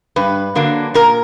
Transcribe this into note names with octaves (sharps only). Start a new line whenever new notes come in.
G2 B4
D3 F#3 A#3 D4
A#2 A#4